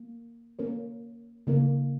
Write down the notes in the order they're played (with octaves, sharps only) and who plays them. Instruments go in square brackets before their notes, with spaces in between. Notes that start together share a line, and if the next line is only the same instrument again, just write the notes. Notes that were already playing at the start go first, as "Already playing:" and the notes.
Already playing: [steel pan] A#3
A#3 C#4 A#4 C#5
C#3 A#3 D#4 A#4